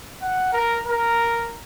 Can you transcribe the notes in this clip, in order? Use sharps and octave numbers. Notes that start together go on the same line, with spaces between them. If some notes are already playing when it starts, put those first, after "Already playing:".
F#5
A#4
A#4